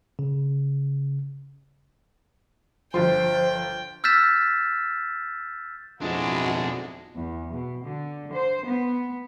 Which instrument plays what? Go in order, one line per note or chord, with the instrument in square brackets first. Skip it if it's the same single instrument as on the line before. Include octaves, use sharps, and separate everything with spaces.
[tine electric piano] C#3
[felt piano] G1 F4 C6 [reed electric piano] F3 [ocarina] C5 [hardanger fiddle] G5
[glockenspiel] E6 F6 G6 A6 B6 E7
[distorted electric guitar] B1 D4 [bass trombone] F2 [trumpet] G#3 [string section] E4 F#4
[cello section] E2
B2
D3
C5
B3